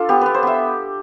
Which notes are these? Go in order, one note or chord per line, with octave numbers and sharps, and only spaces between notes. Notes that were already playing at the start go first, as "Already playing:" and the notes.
Already playing: D4 F4 A4
B3 G4
B3 B4
C5
B3 E5